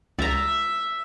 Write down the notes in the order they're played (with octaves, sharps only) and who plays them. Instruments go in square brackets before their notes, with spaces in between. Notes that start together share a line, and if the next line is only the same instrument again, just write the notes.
[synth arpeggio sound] C#2 [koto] D5 A#5 [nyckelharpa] E5